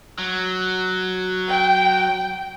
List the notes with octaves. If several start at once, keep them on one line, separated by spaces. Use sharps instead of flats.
F#3
G5